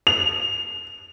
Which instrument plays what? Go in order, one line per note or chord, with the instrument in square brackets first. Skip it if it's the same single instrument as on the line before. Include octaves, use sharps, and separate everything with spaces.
[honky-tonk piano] F7